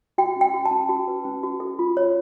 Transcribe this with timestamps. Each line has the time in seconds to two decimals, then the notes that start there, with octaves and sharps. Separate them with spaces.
0.18 F#4 G5
0.36 C#4 G5
0.54 F#4
0.65 A5
0.71 C#4
0.89 F#4
1.08 B4
1.25 C#4
1.43 F#4
1.60 A4
1.79 F4
1.97 C#5